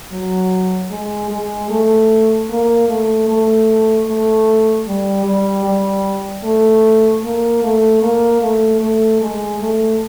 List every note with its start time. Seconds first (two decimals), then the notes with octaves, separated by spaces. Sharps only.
0.12 F#3
0.91 G#3
1.31 G#3
1.70 A3
2.50 A#3
2.89 A3
3.28 A3
4.07 A3
4.87 G3
5.25 G3
5.65 G3
6.44 A3
7.23 A#3
7.63 A3
8.02 A#3
8.42 A3
8.81 A3
9.21 G#3
9.61 A3